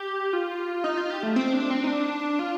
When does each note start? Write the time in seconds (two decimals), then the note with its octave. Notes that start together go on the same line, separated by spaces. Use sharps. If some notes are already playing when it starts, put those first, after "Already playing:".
Already playing: G4
0.33 F4
0.84 D#4
0.97 F4
1.10 G4
1.23 A3
1.36 C4
1.53 D4
1.71 C4
1.84 D#4
1.87 D4
2.39 F4